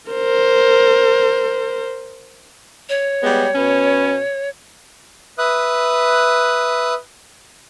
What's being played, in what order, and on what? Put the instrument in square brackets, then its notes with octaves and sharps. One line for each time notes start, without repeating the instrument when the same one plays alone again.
[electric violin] A#4 C5
[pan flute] C#5
[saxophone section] G3 G#3 B3
B2 B3 C#4
[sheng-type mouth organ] B4 E5 D#6 F#6